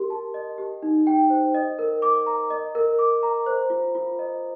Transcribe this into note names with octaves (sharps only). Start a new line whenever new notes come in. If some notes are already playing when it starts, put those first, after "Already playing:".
Already playing: G4 A#4 C6
A5
D#5
G4
D#4
G5
C5
D#5
A#4
D6
A#5
D#5
A#4
D6
A#5
C5
F4
F4
D#5